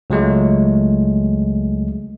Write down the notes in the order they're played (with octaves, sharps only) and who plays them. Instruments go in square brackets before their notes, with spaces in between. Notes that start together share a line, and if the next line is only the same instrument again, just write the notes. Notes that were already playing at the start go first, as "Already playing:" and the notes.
[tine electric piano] C#2 F#3 G#3 A3